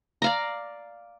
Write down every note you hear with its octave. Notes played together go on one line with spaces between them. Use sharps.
D5 F5 A#5